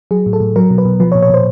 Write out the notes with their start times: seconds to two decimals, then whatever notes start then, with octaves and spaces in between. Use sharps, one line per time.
0.11 F#3 G#4
0.26 A2
0.33 A4
0.40 A2
0.56 F#3 A#4
0.70 B2
0.78 B4
0.85 B2
1.00 F3 B4
1.12 C#5
1.15 A#2
1.22 C#5
1.30 A#2 C5